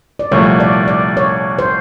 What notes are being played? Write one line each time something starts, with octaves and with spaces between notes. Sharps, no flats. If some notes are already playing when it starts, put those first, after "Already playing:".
D5
C2 A#2 F3 A3 C#5
D5
D5
C#5
C5